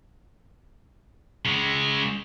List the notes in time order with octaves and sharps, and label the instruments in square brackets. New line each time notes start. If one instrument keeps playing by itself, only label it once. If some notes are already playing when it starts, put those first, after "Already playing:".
[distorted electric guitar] C#3 G#3